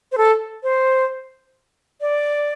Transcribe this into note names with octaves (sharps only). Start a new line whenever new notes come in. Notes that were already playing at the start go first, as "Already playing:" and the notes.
C5
A4
C5
D5